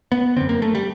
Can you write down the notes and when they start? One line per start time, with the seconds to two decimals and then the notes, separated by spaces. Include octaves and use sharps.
0.12 B3
0.36 F#2 D3 C4
0.49 A#3
0.62 A3
0.75 G3